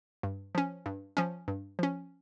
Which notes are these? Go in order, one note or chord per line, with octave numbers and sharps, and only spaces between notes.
G2
F3 C#4
G2
F3 C#4
G2
F3 C#4